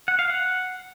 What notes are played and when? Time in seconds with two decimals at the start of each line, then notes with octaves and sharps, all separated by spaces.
0.08 F#5
0.19 F5
0.30 F#5